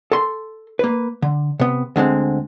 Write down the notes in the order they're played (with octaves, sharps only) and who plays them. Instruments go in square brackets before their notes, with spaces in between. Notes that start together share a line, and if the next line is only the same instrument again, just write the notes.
[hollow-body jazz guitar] A4 C6
A#3 B4
D3
C3 B3
D2 D3 G#3 C4